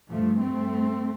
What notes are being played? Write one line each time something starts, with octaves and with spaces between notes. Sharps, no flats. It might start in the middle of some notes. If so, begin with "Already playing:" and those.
G2 F3 A3
A3 C4